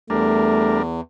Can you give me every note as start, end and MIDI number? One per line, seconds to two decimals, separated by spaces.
0.10 1.01 40
0.10 0.82 55
0.10 0.81 57
0.10 0.82 62
0.10 0.82 70